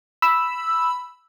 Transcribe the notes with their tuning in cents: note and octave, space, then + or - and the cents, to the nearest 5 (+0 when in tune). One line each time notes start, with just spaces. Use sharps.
B5 +0 E6 +0